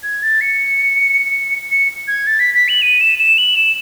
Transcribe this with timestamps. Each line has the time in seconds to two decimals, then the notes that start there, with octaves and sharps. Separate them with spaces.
0.03 G#6
0.22 A6
0.41 C#7
1.71 C#7
2.08 G#6
2.27 A6
2.39 B6
2.54 B6
2.68 F#7
2.82 D#7
3.01 E7
3.19 E7
3.38 F#7
3.56 E7